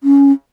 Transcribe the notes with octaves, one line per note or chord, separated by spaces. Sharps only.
C#4